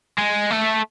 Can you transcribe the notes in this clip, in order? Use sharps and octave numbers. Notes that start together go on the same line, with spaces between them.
G#3
A3